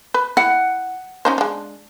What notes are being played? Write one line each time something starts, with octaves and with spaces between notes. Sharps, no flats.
B4
E4 F#5
C#4 D#4 C5
G#3 D4